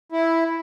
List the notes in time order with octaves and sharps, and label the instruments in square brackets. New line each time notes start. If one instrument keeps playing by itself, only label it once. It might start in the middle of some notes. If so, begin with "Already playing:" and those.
[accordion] E4